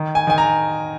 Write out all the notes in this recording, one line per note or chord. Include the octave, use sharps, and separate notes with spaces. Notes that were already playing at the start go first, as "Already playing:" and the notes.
Already playing: D#3
G#5
D#3 G#5
A#5